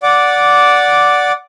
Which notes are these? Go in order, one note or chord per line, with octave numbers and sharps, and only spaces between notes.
D5 F#5 D6